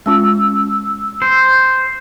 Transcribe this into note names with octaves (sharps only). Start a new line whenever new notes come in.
G#3 C#4 F4 E6
C5